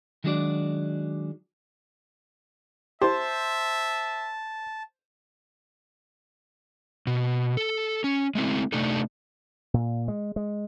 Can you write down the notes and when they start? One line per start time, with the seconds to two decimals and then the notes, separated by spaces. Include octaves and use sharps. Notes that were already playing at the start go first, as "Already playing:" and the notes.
0.24 D#3 F#3 G#3 D4 F#4 D5
3.02 E4 G4 C5 E5 A5
7.07 B2
7.57 A4
8.04 C#4
8.35 G#3 A3 C4 E4
8.72 C3 A3 D4 D#4 A4
9.74 A#2
10.08 G#3
10.36 G#3